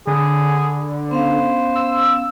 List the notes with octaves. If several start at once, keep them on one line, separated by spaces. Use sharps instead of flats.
D3 G#4 B5
B3 C#4 C5 F5
E6